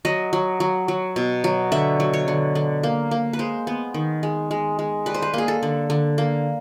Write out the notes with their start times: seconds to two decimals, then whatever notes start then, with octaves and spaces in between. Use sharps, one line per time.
0.05 F#3 D#5
0.33 F#3
0.60 F#3
0.88 F#3
1.16 B2
1.44 F#3
1.72 D3 E5
2.00 F#3
2.13 C#5
2.28 D3
2.55 D3
2.83 A#3
3.11 A#3
3.33 B4
3.39 G#3 C5
3.67 B3
3.94 D#3
4.23 G#3
4.51 G#3
4.79 G#3
5.06 G3 B4
5.14 C5
5.22 B4
5.34 A#3 G#4
5.48 A4
5.63 D3
5.90 D3
6.18 A#3